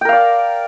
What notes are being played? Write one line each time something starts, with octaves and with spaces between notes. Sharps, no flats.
A#4 D5 F5 G5